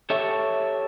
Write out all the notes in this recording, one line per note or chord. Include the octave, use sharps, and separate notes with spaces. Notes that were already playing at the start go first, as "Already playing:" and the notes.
G4 A4 C#5 E5